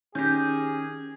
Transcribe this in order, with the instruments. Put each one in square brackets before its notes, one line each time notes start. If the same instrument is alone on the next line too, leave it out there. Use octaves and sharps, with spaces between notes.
[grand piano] D#3 A#6 [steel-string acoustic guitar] C#4 [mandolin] G4 G6 [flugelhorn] G#4